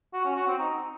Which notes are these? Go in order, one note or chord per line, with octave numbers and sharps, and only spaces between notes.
F#4
C#4
F#4
C4
D#4